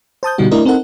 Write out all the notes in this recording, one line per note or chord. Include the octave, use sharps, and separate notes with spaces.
C5 A5 D#6 G6
B2 D3 G3 D#4 F#4
A3 D4 E4 A#4 D5 D#5
C4 D#4 A4 A#4 F#5